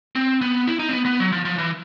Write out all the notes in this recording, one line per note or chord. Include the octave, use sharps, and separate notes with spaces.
C4
B3
E4
D#4
C4
B3
B3
F#3
F3
F3
E3